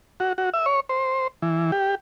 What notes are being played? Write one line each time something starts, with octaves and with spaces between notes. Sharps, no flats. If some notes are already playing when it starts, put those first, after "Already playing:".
F#4
F#4
E5
C#5
C5
E3
G4